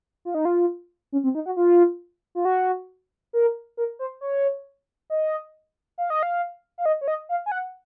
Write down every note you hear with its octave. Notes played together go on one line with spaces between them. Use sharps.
F4
D#4
F4
C#4
C4
D#4
F#4
F4
F4
F#4
A#4
A#4
C5
C#5
D#5
F5
D#5
F5
F5
D#5
C#5
D#5
F5
G#5
F#5